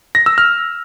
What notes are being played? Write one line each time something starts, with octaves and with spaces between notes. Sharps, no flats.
A#6
E6
F6